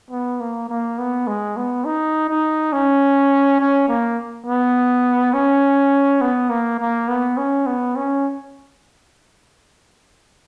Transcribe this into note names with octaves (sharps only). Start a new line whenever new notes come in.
B3
A#3
A#3
B3
G#3
B3
D#4
D#4
C#4
C#4
A#3
B3
C#4
B3
A#3
A#3
B3
C#4
B3
C#4